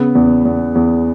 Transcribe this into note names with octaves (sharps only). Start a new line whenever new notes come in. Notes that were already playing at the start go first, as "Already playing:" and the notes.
Already playing: C#3 B3
E2
E2
E2